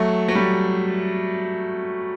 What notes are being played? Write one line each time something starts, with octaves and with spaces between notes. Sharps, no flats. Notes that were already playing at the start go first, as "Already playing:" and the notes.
Already playing: F#3 A3
F#3
G3